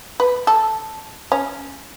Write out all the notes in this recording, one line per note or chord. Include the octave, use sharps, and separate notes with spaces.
B4
A4
C#4